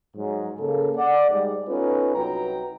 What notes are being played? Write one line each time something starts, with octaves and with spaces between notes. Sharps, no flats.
G#2 F#3
C#3 A#3 A4
D5 F#5
G#2 G3 G#3
B3 C#4 D#4 F4 A4 B4
C2 F#3 D#4 B4 G5 A#5